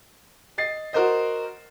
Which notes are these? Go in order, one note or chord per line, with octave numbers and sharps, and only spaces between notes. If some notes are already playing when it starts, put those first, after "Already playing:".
D#5 A6 C7
F#4 A#4 C5 D#5